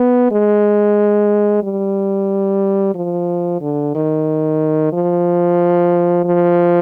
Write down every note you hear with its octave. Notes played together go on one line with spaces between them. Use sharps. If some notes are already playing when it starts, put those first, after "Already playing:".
Already playing: B3
G#3
G3
F3
D3
D#3
F3
F3